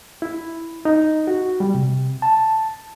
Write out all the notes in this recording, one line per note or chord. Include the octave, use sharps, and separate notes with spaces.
E4
D#4
F#4
G3
C3
A5